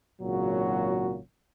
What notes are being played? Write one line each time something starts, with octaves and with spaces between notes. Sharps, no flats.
G#1 A#2 C#3 F#3 F#4